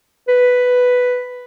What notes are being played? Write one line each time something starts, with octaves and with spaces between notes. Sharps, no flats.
B4